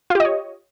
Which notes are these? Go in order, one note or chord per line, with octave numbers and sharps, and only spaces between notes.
F4 G4 C#5 D#5